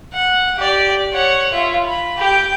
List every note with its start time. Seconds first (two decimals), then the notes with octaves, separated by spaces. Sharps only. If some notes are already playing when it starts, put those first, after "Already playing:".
0.13 F#5
0.57 G4 D5
1.13 C#5 F#5
1.53 F4 E5
1.86 B5
2.18 G4 G5